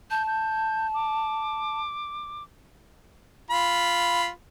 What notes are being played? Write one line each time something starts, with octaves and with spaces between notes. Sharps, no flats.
A5 G6
G6
D6
F4 B5